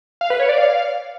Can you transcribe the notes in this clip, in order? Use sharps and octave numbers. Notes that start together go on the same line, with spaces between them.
F5
B4
C#5
D5
F5